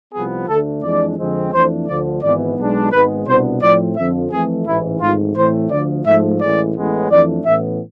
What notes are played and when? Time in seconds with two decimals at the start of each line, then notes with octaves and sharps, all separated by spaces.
0.13 C2 C3 F3 B3 G#4
0.48 D2 D3 A3 D4 A4
0.83 F2 E3 G#3 D4 D5
1.17 F2 D3 F3 G#3 C4
1.52 F2 E3 A3 D4 C5
1.87 D2 D3 F3 D5
2.22 G#1 G#2 E3 G#3 B3 D5
2.58 B1 B2 G#3 D4
2.92 G#1 G#2 G#3 B3 B4
3.27 C2 B2 B3 D4 C5
3.61 A2 F3 A3 C4 D5
3.97 F2 D3 F3 E5
4.31 F2 E3 A3 G#4
4.66 A1 G#2 E3 E4
5.01 G#1 G#2 E3 A3 F4
5.36 A2 E3 A3 C4 C5
5.71 D2 D3 F3 A3 D5
6.05 G#2 F3 A3 E5
6.41 A1 A2 E3 G#3 D5
6.76 A1 A2 G#3 B3
7.10 F2 E3 A3 D4 D5
7.45 A1 A2 E3 B3 E5